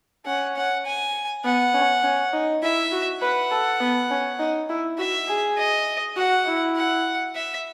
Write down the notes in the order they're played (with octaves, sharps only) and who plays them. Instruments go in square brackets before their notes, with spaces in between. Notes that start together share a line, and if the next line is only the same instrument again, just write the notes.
[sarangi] C#4 [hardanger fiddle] F#5
[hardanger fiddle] F#5
G#5
[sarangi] B3 [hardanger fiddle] F#5
[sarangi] C#4
C#4
D#4
[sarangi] E4 [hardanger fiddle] E5
[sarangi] F#4
[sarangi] B4 [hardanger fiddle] F#5
[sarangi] A4
B3
C#4
D#4
E4
[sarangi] F#4 [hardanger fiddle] E5
[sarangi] G#4
[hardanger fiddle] D#5
[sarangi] F#4 [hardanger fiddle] F#5
[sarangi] E4
[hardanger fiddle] F#5
E5